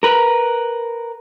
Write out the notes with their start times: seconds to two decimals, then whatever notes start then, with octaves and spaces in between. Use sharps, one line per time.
0.03 A#4 B4